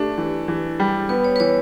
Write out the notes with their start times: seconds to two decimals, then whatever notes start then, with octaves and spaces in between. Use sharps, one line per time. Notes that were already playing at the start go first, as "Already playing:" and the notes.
Already playing: A3 D4 G4
0.18 E3
0.48 E3
0.80 G3
1.09 B3 B4
1.24 C#5
1.36 B4
1.40 E3 C#5